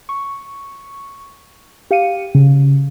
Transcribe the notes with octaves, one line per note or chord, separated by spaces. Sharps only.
C#6
G4 F5 C#7 D#7
C#3